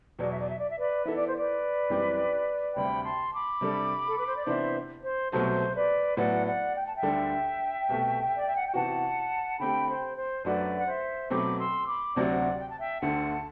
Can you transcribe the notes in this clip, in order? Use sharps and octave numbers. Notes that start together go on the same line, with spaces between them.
E2 B2 F#3 D5
E5
D5
E5
D5
E5
B4 D5
E3 B3 E4 A4 E5
D5
C5
B4 D5
F#2 E3 G3 C4 G4
D2 C3 G3 G5 B5
A5 C6
B5 D6
C3 G3 D4 A4
A4
B4
C5
D5
C3 E3 B3 D4 C5 E5
C5
C2 B2 F#3 A3 C5
B4 D5
A2 F#3 B3 D5 F#5
D5 F#5
G5
A5
E5 G5
D2 D3 G3 D4 A4
C2 B2 A3
D5
E5
F#5
G5
C3 E3 B3 F#4 F#5 A5
D3 A3 C4 G4 G5 B5
C5
C5
F#2 F#3 A3 D4 F#4 B4 D5
F#5
C5 E5
B2 F#3 A3 C4 B5 D6
C6 E6
B5 D6
D2 C3 F#3 C4 F#4 D5 F#5
G5
A5
E5 G5
D2 D3 A3 F#5 A5